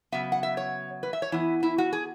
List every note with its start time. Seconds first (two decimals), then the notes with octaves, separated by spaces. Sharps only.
0.12 C#3 F#3 B3 E5
0.32 F#5
0.43 E5
0.57 C#5
1.03 B4
1.13 E5
1.22 C#5
1.32 E3 B3 E4
1.63 E4
1.78 F#4
1.93 G#4